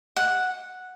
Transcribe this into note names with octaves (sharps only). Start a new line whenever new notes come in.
F#5